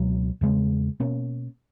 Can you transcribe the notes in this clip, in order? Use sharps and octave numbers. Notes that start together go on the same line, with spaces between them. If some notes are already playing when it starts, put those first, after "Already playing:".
Already playing: C#2 B2 F#3
E2 C#3 G#3
B2 A#3 C#4